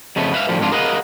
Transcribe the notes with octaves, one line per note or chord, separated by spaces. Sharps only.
F2 C#3 A3 B3
B4 E5 F5
A2 D3 F3 G3
F2 G#2 D4 F4
G#4 A#4 B4 D#5 F5 F#5